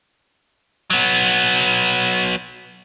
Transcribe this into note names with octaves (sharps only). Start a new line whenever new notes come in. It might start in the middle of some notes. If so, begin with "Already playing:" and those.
F#3 B3